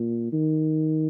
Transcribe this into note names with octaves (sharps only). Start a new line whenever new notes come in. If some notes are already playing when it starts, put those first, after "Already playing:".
Already playing: A#2
D#3